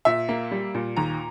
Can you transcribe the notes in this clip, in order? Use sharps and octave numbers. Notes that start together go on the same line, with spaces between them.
A#2 E5
A#3
G3
A#2
D#2 A#5